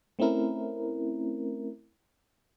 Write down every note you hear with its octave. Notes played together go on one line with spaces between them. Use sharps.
A3 C4 C#4 E4 A#4